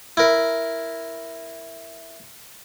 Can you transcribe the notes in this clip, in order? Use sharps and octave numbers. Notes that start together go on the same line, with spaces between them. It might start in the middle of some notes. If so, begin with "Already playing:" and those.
E4 A#4